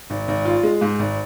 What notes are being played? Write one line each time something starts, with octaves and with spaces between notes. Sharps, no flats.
G#1
G#1
F4
G#3
G#2
G#1